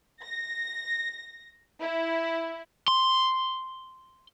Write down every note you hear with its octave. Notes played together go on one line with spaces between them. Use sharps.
A#6
E4
C6